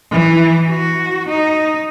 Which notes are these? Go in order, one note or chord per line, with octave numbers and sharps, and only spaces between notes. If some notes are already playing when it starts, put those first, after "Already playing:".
E3
F#4
D#4